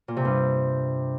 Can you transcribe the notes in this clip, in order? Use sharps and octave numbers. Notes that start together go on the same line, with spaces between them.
A#2
C3
G2